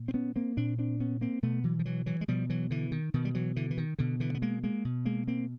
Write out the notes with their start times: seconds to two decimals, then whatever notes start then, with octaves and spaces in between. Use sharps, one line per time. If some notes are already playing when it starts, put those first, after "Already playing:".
Already playing: A#2
0.08 C4
0.14 B3 C#4
0.36 A#3 C4
0.57 A#2 C4 D4
0.79 C4 D4
1.00 B3 C#4
1.21 A#3 C4
1.42 B2 A3 B3
1.64 E3 F#3
1.79 F3
1.85 E3 F#3
2.06 E3 F#3
2.21 G#3
2.28 B2 F3 G3
2.50 E3 F#3
2.71 D3 E3
2.92 D#3
3.14 B2 D#3
3.25 G3
3.34 E3 F#3
3.56 D3 E3
3.71 E3
3.78 D#3
3.99 B2 D3
4.20 D3 E3
4.35 B3
4.42 G#3 A#3
4.63 G#3 A#3
4.85 B2
5.05 G#3 A#3
5.28 A#3 C4